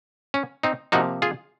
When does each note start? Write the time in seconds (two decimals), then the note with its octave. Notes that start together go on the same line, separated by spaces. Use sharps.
0.34 C#4
0.63 C4 D#4
0.92 C3 F3 A#3 D#4 F#4
1.22 F4 G#4